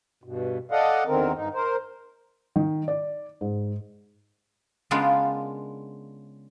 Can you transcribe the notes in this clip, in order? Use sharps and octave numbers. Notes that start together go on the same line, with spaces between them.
G2 B2
A4 D5 D#5 F5 F#5
E2 D3 D#3 C4 A#4
G2 D#4
A#4 C5
D#3
D5
G#2
C#3 G#3 B3 D4 F4 A#4